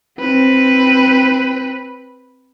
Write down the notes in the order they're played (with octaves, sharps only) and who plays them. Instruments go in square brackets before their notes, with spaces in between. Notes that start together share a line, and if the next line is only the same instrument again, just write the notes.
[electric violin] C4 B4